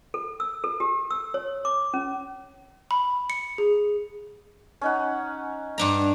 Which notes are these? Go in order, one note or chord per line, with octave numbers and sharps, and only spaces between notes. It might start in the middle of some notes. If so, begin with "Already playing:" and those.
A4
E6
A4
G4
E6
C#5
D6
C#4
B5
C#7
G#4
C#4 D#4 F#5
G2 D4 A#5